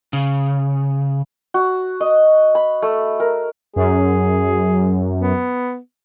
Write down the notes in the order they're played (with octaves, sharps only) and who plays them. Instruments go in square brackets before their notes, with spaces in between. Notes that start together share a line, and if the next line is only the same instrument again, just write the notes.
[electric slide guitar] C#3
[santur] F#4
D#5
B5
A3
A#4
[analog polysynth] F#2 [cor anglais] G#4
[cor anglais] B3